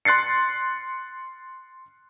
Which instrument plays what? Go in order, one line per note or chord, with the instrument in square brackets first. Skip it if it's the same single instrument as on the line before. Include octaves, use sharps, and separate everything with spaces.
[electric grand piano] C6 F#6 A6 C7 C#7